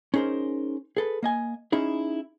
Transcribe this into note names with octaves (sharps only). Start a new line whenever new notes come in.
C#4 D#4 G#4 A#4 C5
G#4 A4 B4
A#3 D#5 G#5
C#4 D#4 E4 G#4